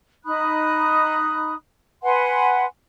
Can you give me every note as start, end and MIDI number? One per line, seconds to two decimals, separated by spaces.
0.25 1.54 63
0.25 1.54 83
0.25 1.54 87
0.25 1.54 90
2.02 2.64 71
2.02 2.64 78
2.02 2.64 80
2.02 2.64 84